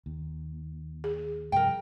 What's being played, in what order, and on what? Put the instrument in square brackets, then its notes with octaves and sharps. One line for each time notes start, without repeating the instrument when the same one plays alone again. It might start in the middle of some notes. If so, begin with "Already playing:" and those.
[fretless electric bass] D#2
[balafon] G#4
[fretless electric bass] G2 C3 F3 [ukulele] A#4 G5